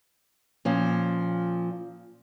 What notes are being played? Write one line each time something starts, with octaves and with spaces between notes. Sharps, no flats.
A#2 F3 C#4